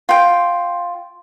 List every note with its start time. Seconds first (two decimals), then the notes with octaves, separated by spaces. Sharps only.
0.09 F4 G5